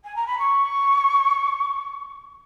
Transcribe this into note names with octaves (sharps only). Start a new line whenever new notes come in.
G#5
A#5
B5
C#6